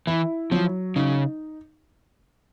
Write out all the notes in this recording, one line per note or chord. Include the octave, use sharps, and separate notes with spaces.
E3 E4
F3 F#3
C#3 D#4